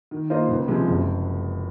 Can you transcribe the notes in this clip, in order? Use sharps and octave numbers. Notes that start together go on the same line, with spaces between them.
D#3
A#3 F4 C5 D#5
C#2
C3 F3 G#3
F#1